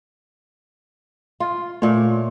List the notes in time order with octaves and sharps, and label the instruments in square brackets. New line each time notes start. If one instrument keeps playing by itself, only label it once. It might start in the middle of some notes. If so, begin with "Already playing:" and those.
[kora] F4
[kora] A#2 C#5 [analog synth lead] A3